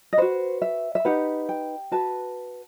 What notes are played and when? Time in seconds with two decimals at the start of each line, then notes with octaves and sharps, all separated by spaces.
0.13 D#5
0.18 F#4 B4 C5
0.62 E5
0.95 E5
1.05 D#4 G4 B4 F#5
1.49 G5
1.92 F#4 B4 A5